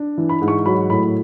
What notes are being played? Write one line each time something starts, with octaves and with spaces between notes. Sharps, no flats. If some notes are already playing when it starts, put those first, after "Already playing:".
Already playing: D4
E3
B5
G#2
C#6
F#3 B5
A2 B5